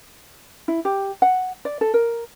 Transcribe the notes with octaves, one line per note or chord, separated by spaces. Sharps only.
E4
G4
F#5
D5
A4
A#4